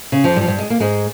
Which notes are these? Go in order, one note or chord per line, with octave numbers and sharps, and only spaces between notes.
C#3
F2 F3
G2 G3
F3
G2 G3
G#3
A#3
G#2 G#3